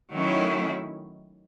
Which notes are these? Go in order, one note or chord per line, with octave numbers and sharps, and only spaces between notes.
D#3 F#3 A3 C#4 E4